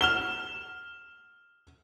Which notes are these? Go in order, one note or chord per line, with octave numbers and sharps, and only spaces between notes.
F6 E7 G7